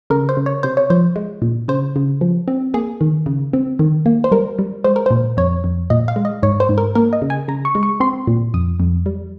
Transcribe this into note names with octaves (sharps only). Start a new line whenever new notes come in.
C#3 A#4
C5
C#3
C#5
C3 C5
C#5
F3 C5
G#3
A#2
C#3 C5
C#3
F3
C4
A#3 G#4
D#3
C#3
C4
D#3
A#3
C5
G3 A#4
G3
G#3 C5
A#4
A#2 C5
F2 C#5
F2
A#2 D#5
F5
G#3
D#5
G#2 C#5
C5
G#2
A#4
A#3 A#4
D#5
C#3
G#5
C#3 A#5
C#6
G#3
C#6
C4 C6
A#2
F2 D#6
F2
G3